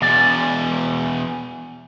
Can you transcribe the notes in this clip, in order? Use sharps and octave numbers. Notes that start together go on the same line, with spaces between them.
E2 B2 D5